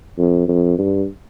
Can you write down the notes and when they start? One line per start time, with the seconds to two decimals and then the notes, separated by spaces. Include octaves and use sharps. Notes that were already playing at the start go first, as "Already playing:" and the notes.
0.18 F2
0.48 F2
0.78 G2